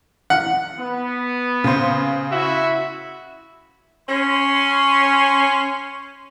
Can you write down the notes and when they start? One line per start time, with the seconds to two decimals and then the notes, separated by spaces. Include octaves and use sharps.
0.30 F#5
0.78 B3
1.64 C#3 C5
2.31 E4 F#4 E5
4.09 C#4 C6